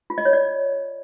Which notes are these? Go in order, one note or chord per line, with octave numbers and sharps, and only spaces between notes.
F4
D#5
C#5
D5